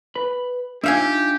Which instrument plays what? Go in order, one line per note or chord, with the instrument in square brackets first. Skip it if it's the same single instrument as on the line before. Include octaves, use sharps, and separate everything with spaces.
[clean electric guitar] B4 B5
[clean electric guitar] D4 D#4 F4 [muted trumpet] G4 [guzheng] E5 F5 G#5